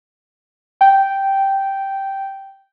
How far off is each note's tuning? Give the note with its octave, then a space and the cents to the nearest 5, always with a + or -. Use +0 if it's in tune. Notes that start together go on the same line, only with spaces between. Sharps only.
G5 -5